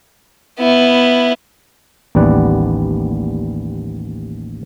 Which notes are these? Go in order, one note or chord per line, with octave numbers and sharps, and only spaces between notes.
B3 E4
A1 D#2 G3 B3 D5 F#5